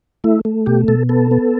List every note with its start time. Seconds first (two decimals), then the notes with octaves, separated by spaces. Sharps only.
0.24 A3 E4
0.45 A3
0.66 B2 G4
0.88 B2 A4
1.09 B3 A4
1.31 B3